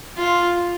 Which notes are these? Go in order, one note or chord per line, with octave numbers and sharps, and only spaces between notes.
F4